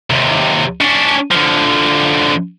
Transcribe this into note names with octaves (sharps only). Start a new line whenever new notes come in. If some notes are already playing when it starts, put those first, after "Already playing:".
D#2 C3
C#4 D4
D3 F3